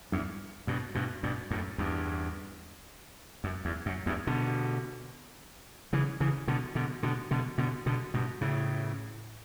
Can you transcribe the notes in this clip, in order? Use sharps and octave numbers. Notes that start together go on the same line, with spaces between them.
E2 G2
G2 B2
G2 B2
G2 B2
F#2 A2
E2 G2
F#2
E2
F#2
E2 G2
B2 D3
C#3 E3
C#3 E3
B2 D3
B2 D3
B2 D3
B2 D3
B2 D3
B2 D3
G2 B2
A2 C#3